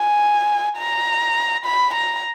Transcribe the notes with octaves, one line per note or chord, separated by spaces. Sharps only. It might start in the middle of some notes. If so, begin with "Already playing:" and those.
Already playing: G#5
A#5
B5
A#5